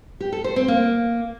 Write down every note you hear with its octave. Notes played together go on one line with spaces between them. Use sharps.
G4
A4
C5
C4
A#3